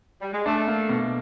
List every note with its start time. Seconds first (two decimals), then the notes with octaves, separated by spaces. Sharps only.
0.21 G3
0.33 G#3
0.46 A3 D4
0.67 A#3
0.89 B2